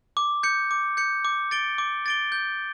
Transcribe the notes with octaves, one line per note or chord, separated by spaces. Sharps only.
D6
G6 C#7
D6
G6 C#7
D6
A6 D7 G7
D6
A6 D7 G7
G6